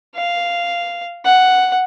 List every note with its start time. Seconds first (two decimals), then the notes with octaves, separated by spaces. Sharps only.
0.16 F5
1.25 F#5